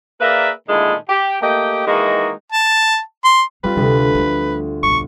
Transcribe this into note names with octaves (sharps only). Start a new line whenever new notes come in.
A#3 G#4 A#4 B4 D5 E5
A#2 D3 D#3 G#3 A3 E4
G4
A3 A#3 G4 D#5 G5
D#3 E3 G#3 A#3 D#4 F#4
A5
C6
G3 C4 D#4 F4 B4
D2 C3 G3 A4 B6
F3 A3
B1 G2 C#6